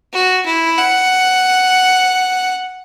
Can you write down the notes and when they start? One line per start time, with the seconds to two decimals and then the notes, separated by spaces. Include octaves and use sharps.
0.13 F#4
0.46 E4
0.78 F#5